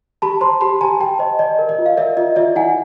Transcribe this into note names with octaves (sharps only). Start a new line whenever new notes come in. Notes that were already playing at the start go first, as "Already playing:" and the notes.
G4 A5 B5
C5 A#5 C6
G4 A5 B5
G4 G#5 A#5
G4 G5 A5
C5 D#5
D5 D#5
A#4
D#5
F4
F5
A#4 D5 E5
F4 D#5
F4 D5 E5
E4 F#5 G#5